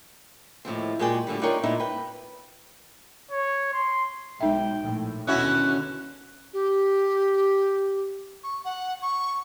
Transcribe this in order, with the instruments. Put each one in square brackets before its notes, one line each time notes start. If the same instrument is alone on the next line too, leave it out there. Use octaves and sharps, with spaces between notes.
[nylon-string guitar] D#2 A2 F3 C4
A#2 G#3 F#4 G#4 D5 G5
A2 D3 G3
D4 D#4 F4 A#4 C#5 G5
A#2 G#3 A3 D#4 E4
B4 G5
[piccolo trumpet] C#5
C6
[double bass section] B1 [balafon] G#3 D#4 E5 [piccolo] G5
[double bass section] A#1 A2
[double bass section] D#2 B2 D3 [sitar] C#4 E4 F#4 [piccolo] F#6
[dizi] G4
C#6
F#5
C#6